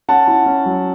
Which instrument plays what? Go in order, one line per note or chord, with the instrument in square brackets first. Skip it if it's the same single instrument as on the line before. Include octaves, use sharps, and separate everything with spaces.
[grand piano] C#4 F#5 A5
E4
C#4
F#3